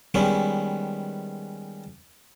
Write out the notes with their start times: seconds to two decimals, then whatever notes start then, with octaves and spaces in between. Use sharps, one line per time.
0.14 D#3 G3 G#3 B3 C#4